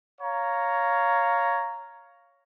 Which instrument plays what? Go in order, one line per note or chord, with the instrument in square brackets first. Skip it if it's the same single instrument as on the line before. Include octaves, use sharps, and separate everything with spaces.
[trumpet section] C#5 F5 A#5